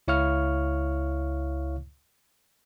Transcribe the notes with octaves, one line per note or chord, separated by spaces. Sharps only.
C#2 E4 C#5 F5 C#6 F6